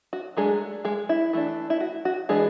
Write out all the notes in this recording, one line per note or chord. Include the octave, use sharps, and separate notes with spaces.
F#4
F#3 G#3 A3 D4 G#4
G#3 G#4
E4
E3 A3 D4
E4
F#4
F#4
E3 G#3 B3 D4 G#4